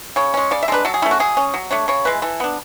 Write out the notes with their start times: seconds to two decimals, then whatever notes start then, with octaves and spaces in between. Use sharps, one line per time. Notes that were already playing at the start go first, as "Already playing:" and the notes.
0.16 C#3 C#5
0.34 G#3 C#4
0.51 C#3 D5
0.63 E5
0.68 G#3 A4
0.72 D4 B4
0.85 F#3 A4
0.94 G#4
1.02 A3 C#4 E4
1.11 F#4
1.20 F#3 G#4
1.37 C#4
1.54 F#3
1.71 A3 D4 C#5
1.88 C#3 C#5
2.05 E3 G#3 B4
2.22 E3 A4
2.40 B3 D4